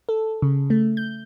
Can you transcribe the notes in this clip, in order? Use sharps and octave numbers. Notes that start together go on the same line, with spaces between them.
A4
C#3
A3
G6